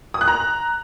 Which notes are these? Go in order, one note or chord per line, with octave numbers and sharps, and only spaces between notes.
D#6
F#6
A#5